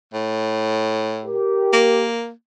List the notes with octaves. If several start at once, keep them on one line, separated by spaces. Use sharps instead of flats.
A2
G4 A#4
A#3